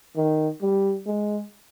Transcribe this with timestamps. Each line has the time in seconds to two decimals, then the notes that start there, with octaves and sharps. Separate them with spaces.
0.17 D#3
0.62 G3
1.07 G#3